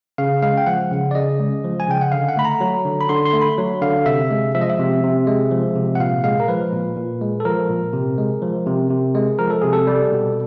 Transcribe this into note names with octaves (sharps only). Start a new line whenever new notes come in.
C#3 F5
G#3 F5
G5
F3 F#5
C#3
D5
C#3 D#5
G#3
F3
G#5
C#3 G5
F#5
D3 F5
F#5
A3 B5
A#5
F#3
D3
B5
D3 C6
C6
A3
B5
F#3
D3 F5
C3 E5
G#3
F3 E5
D#5
E5
C3
C3
G#3
F3
C3
F#5
A#2 F5
G#3 F5
A#4
F3 B4
A#2
A#2
G#3
A4
F3 A#4
A#2
C3
G#3
F3
C3
C3
G#3
F3 A#4
A4
C3 G#4
A4
G3
B2